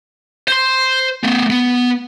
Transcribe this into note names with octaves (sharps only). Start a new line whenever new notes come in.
C5 C6
A3 B3
B3